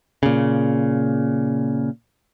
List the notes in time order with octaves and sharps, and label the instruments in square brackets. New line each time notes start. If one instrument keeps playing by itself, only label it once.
[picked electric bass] A#2 C#3